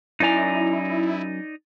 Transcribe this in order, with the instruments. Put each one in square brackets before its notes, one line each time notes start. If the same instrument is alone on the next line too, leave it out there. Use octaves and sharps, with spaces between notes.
[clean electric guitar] F#2 G#5 [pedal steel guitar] D#4 D5 A#5 [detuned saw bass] E4